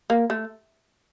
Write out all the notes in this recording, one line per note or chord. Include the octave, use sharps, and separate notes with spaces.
A#3
A3